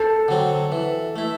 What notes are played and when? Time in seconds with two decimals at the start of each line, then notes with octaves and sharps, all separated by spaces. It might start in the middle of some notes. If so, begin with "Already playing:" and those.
Already playing: A4 A5
0.28 D3 F#3 C4
0.72 E3
1.16 A3 E4